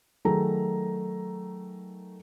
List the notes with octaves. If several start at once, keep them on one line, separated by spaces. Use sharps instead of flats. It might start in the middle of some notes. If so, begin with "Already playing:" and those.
D#3 F#3 A3 G#4 A#5